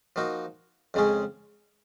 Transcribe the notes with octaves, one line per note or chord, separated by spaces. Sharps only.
F3 A#3 D#4 F#4
F2 C#3 G#3 C#4 G#4